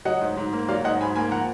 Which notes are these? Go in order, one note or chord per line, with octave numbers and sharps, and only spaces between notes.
F#3 D#5 F#5
G#2
G#2
A#3
F#3 D5 F5
G#2 D#5 F#5
G#2 G#5 B5
A#3 G#5 B5
F3 F#5 A#5